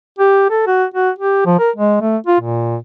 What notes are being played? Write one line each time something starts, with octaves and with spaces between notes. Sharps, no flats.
G4
A4
F#4
F#4
G4
F3
A#4
G#3
A3
F4
A#2